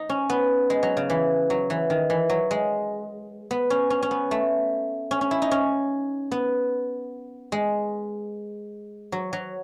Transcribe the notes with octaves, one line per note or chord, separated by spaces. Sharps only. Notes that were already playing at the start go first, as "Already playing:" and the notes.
Already playing: D#4
C#4
B3
G#3
F#3
C#3
E3
F#3
E3
D#3
E3
F#3
G#3
B3
C#4
C#4
C#4
B3
A3
C#4
C#4
E4
D#4
C#4
B3
G#3
F#3
F#3